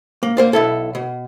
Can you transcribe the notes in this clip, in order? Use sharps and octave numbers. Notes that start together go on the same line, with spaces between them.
A#3
A#3 C5 D5
B1 E4 A4
B2